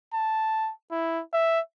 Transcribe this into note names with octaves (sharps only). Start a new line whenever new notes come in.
A5
E4
E5